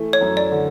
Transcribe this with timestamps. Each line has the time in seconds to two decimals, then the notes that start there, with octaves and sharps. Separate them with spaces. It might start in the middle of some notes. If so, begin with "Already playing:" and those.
Already playing: E3 A3
0.13 C#5
0.21 F#2
0.37 D5
0.52 D3